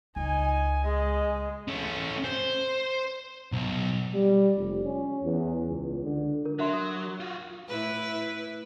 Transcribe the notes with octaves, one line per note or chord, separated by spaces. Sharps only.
C#2 D#4 G#5
G#3 D#5
A3 C#4
C5
B1
G3
F1
C#4
E2
C#2
D3
A#4
F#3 D4 E5 C6
D#6
F4 F#4
A2 E4 B4